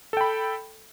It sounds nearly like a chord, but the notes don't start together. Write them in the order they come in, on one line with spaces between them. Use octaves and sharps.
A4 G5 B5